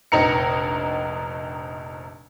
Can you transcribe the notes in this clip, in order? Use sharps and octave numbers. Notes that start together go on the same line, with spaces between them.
F1 A#1 D#4 A#5 C#7